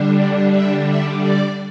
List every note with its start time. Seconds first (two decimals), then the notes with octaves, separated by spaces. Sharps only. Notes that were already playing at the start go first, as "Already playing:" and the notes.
Already playing: D3 G3 D4
0.54 E5
0.89 E5
1.23 D5